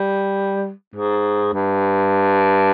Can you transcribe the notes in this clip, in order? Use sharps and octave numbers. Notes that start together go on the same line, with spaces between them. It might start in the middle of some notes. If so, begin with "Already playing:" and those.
Already playing: G3
G#2
G2